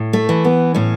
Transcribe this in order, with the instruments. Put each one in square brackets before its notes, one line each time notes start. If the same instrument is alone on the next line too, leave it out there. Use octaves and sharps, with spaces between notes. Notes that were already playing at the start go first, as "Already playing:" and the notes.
Already playing: [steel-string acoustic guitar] A2
A3
E3
B3
A2 C#4